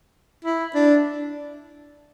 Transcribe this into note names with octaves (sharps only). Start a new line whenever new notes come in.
E4
D4